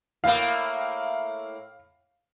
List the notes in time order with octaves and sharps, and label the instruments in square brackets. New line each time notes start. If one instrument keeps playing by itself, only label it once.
[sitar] A2 A#3 [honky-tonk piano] F5